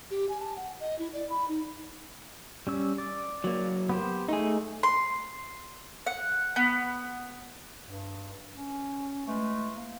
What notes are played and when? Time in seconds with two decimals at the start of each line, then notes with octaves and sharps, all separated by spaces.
0.11 G4
0.29 G#5
0.40 A5
0.56 F#5
0.80 D#5
0.99 E4
1.13 D5
1.30 B5
1.48 D#4
2.67 G3 C#4 E6
2.98 D5
3.44 F#3 A#3
3.89 B3 G4 C5
4.29 A3 D#4 G#4
4.83 C6
6.06 F#5
6.56 B3
7.86 G2
8.57 C#4
9.27 E3 G#3 A3
9.76 A#3